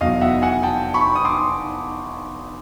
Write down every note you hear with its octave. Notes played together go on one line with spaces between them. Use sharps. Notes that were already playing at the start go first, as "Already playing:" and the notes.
F1 E2 B2 F#3 D#5 F5
E5 F#5
F#5 G#5
G5 A5
B5 C#6
D#6
C6 D6